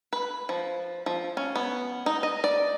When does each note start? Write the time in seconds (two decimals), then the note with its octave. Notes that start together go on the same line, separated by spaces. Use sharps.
0.13 B4
0.49 F3
1.06 F3
1.37 C#4
1.56 B3
2.06 D#4
2.23 D#5
2.44 D5